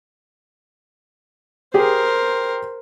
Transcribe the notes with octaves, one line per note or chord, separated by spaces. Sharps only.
G4 G#4 A#4 C5